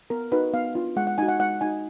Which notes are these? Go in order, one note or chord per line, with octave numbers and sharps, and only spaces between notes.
B3 A#4
D#4 F#4 B4
B3 F5
D4 F4
G#3 F#5
F#5
D#4 F#4 G#5
F#5
G#3 F#5
D#4 F#4 G#5